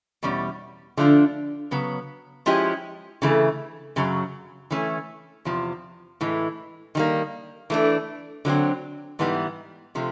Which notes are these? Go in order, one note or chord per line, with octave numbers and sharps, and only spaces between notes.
E2 B2 G3 C#4
D3 F3 A3 D4 F4
C#3 F#3 B3
F3 G#3 C#4 E4 G4
C#3 E3 A3
F#2 C#3 F#3
E3 A3 C#4
E2 C3 F3
A2 E3 G#3
D#3 G3 A#3
E3 A3 D4
D3 F#3 A3 C4
G#2 E3 G3 B3
C3 F3 A3